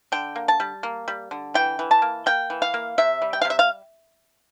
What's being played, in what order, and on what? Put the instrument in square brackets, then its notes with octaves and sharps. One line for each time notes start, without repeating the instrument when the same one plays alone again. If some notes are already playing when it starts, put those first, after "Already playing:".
[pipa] D3 G5
A#3
A5
G3
A#3
G3
D3
E3 G5
E3
A5
A#3
A#3 G5
E3
F5
A#3
C3 E5
G3
G5
F5
C3
E5
F5